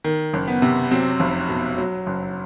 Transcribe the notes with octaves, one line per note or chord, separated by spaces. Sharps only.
D#3
F#1
B3
C3
F#3 C4
F1
B2
F#3
F#1